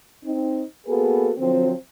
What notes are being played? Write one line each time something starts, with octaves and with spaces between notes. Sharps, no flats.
C4 D#4
A#3 B3 F#4 G#4 A4 B4
D3 F3 F#3 C4